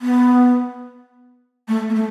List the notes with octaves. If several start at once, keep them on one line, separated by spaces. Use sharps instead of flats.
B3
A3
A#3
A3